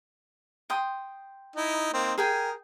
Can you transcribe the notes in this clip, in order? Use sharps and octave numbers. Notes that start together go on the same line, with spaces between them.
G5 C6 D#6
D#4 E4
A#3 C4 D#4
G#4 A#4 G5 G#5